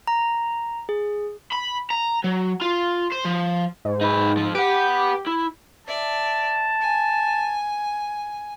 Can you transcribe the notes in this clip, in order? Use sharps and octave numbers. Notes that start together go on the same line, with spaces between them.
A#5
G#4
B5
A#5
F#3
F4
C5
F3
G#2
D#4 B4
F2 F3
G4 B4 F#5
E4
D5 E5 A5
G#5